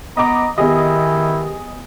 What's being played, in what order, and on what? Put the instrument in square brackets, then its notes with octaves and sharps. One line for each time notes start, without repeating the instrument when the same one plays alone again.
[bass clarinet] B3 [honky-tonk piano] D#5 D6 [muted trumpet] A#5
[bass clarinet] D#3 [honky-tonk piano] B3 G#4 D#5 [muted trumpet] E4 [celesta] G4